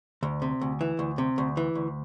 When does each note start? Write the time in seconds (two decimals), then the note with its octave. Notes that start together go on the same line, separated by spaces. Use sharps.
0.23 D2
0.42 C3
0.62 D2
0.81 E3
0.99 D2
1.18 C3
1.38 D2
1.57 E3
1.75 D2